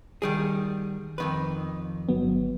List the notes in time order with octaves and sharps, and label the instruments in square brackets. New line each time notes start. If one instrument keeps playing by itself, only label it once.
[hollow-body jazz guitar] D#3 G3 G#4
F2 D#3 B4
[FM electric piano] G1 F#3 B3